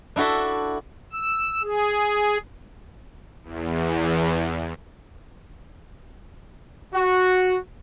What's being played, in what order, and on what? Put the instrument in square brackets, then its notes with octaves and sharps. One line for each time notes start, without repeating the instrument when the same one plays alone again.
[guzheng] D4 E4 F#4 A4 E5
[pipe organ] E6
G#4
[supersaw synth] E2
[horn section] F#4